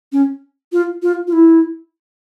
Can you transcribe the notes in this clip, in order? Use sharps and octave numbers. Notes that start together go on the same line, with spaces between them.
C#4
F4
F4
F4
E4